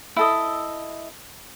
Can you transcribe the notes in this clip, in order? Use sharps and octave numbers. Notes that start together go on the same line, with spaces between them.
E4 A4 D#5